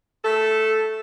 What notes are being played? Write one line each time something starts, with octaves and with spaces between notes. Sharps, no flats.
A3 A4